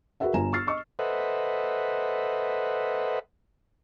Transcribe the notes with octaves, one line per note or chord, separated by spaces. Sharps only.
F#4 G#4 A#4 B4 E5 F#5
G1 F4 G#5 A#5 E7
C#6 E6 F6 A6 C7
D#5 C#6 E6
A4 B4 C5 D#5 E5 F#5